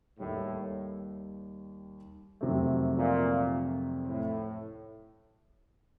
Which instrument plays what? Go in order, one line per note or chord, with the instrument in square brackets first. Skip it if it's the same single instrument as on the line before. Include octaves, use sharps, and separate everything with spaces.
[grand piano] D#2 D#3 G3 [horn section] A2
[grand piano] F2 C3 D#3 F#3 A3
[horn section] A#2
A2